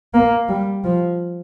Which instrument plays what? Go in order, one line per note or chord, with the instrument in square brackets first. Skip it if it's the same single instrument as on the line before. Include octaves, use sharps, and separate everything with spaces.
[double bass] A#3
G3
F3